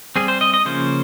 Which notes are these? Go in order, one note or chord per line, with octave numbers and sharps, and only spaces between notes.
G3 C4 G#4
C5
D#5
D#5
C#3 F3 A#3 C#4 C5